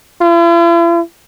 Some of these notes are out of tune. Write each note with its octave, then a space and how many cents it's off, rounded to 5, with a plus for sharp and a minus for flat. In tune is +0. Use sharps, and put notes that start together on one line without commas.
E4 +45